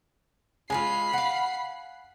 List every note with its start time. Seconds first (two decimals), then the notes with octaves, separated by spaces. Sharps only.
0.70 G#3 D#4 F4 G#5 B5 C7
1.13 F5 F#5